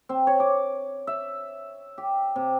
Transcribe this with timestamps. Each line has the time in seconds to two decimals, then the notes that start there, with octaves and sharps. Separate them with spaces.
0.09 C4
0.27 C#5
0.40 D6
1.07 E5
1.98 G4
2.36 C3